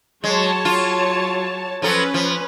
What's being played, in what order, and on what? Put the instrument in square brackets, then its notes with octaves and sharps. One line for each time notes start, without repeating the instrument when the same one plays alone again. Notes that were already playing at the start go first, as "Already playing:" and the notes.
[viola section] F#3 C#5 A5 [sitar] G#3
[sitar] F4
[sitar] F3 F#3 A4 [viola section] C#4 B4
[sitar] F3